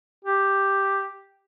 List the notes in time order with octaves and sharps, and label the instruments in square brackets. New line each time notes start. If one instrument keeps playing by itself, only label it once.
[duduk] G4